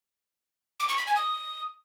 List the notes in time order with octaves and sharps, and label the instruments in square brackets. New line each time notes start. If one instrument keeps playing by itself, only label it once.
[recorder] D6
C#6
B6
G#5
D#6